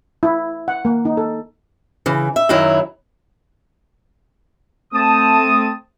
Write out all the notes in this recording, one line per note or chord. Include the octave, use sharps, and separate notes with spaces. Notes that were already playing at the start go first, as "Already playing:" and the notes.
E4
F#5
A#3
D#4
A4
C#3 E3
E5
F#2 D#3 F#3 E4
A3 C4 A5 D#6